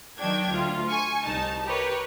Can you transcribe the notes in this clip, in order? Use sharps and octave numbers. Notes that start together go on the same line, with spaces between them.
D#3 F#3 D4 G5 G#6
D2 F4
G#5 C#6
C2 D#4 A5
G4 A#4 B4 C#5